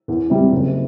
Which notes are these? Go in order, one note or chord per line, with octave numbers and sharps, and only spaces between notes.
E2
C3 G3
F#1